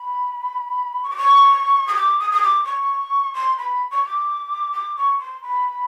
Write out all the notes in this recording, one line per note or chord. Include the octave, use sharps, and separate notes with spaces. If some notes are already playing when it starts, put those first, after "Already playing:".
Already playing: B5
C#6
D6
C#6
D#6
D6
D#6
D#6
D6
C#6
C6
B5
C#6
D6
D6
C#6
C6
B5